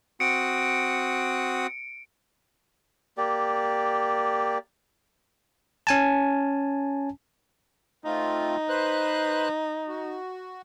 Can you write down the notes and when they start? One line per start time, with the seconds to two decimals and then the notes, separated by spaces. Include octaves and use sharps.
0.20 C4 F#4 D#6 C#7 D7
3.18 A#3 G4 D5
5.87 C#4 G#5 A5
8.05 A3 C4 D#4 F4
8.69 B4 C5 F#6
9.88 F#4